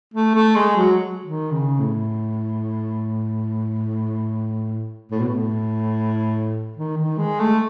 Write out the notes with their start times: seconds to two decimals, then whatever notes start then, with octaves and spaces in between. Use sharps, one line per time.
0.14 A3
0.35 A3
0.55 G#3
0.76 F#3
1.24 D#3
1.52 C#3
1.80 A2
5.11 A2
5.20 B2
5.29 A2
6.77 D#3
6.97 D#3
7.18 G#3
7.40 A3